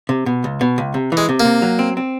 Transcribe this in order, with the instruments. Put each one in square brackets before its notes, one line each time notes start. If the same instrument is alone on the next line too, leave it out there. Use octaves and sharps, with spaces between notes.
[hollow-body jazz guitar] C3
B2
C#2
B2
C#2
C3
E3
[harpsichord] G#3
[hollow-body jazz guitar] C3
[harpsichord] A#3
[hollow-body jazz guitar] C3
F#3
C4
C4